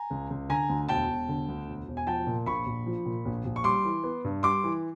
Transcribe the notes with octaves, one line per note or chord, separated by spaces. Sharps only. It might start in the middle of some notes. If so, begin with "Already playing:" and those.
Already playing: G#5 A#5
C#2
C#2
D3 G#5 A#5
D2
E1 G5 A5
E1
D3
D2
E1
E1
G#5
F3 G5 A5
A#2
A#1 B5 C#6
A#1
F3
A#2
A#1
A#1
C#6
G3 C6 D6
E3
B3
G2
G3 C6 D6
E3